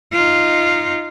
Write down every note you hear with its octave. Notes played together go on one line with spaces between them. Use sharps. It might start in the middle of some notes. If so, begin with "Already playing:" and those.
D#4 F4